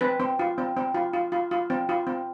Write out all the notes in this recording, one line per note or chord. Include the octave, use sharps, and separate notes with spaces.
C4 B4
C4
F4
C4
C4
F4
F4
F4
F4
C4
F4
C4